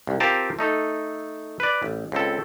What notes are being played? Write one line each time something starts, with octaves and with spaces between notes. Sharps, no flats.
C2
C4 F4 G4 A#4 A5
A3 D#4 A4
B4 D5
A1
C#2 C4 A4